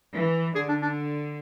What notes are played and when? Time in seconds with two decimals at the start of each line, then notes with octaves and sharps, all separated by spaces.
0.14 E3
0.54 D3 G#4
0.69 D4
0.82 D4